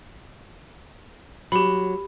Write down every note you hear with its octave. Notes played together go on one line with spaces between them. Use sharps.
F#3 G4 B5